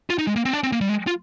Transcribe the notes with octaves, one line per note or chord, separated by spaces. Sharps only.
F4
D#4
G#3
A#3
C4
D4
C4
A#3
G3
G#3
F4